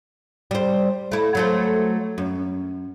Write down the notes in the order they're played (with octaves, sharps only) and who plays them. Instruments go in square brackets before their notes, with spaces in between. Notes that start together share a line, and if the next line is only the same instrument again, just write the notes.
[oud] G3 C5
A3 E4
F#3 A3 C5
F#2